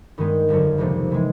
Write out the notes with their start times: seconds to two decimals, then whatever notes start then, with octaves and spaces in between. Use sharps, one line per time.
0.18 G2 D#3 G#3 B3 D#4
0.48 G1 F2 D3 F#3
0.78 C#2 C3 F3 A#3 D#4
1.10 C3 E3 G#3